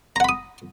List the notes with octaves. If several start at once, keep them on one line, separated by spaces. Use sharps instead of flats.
F#5 A#5 B5 D#6